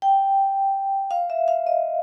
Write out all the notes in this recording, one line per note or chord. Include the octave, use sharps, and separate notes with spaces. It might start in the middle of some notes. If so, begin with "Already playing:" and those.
G5
F5
E5
F5
D#5